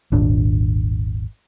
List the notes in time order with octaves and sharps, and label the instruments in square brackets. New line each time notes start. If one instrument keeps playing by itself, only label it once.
[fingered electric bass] D#1 G#1 D4